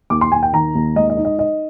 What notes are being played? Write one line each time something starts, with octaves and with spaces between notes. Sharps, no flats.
D#2 D6
C6
D#2 G#5
G5
D#3 A#5
D#2
G#3 D#5
D#5
D#4
D#5
D#4 D#5